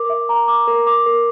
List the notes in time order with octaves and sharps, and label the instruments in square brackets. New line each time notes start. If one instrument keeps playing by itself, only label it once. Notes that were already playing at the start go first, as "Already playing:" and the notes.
Already playing: [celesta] A#4 D6
E5
A#5
D6
A#4
D6
A#4